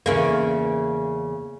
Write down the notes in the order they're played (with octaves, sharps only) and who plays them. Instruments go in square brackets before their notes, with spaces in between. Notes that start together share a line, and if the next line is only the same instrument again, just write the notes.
[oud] E2 C#3 A#3